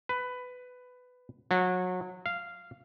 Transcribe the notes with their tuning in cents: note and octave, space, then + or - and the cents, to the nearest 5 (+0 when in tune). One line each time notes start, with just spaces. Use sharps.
B4 +15
F#3 -25
F5 -10